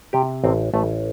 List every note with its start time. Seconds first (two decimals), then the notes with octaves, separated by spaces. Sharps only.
0.13 C3 G4
0.44 A1 C4
0.74 A1 A3